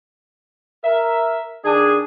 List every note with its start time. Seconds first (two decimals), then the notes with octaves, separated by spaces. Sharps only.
0.84 A#4 E5
1.65 D#3 D4 G#4